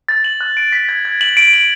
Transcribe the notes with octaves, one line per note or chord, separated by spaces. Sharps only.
A6
F#7
F#6
D7
B6
G#6
G#6
F#7
D7
F#7